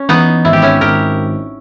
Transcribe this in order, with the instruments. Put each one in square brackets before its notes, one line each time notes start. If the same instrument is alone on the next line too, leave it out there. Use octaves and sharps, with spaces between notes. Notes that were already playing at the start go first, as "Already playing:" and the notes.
Already playing: [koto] C#4
[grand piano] E3 [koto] B3 D#4
[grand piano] G#1 [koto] E4
[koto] G4
C#4 E4
[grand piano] G#1 [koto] G4 A#4